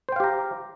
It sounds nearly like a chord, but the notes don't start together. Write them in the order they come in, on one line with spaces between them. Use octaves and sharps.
C5 G5 F5 G4 A#5